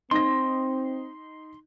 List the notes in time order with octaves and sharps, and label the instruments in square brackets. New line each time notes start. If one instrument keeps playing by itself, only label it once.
[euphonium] C4 [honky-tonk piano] D#4 A#6 [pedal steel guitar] C6